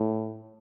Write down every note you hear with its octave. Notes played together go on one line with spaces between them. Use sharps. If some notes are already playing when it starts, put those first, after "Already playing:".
Already playing: A2